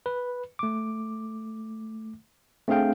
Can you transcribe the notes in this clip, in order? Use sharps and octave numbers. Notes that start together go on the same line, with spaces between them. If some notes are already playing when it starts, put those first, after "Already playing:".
B4
A3 D6
A3 C4 D4 G#4 F5 G5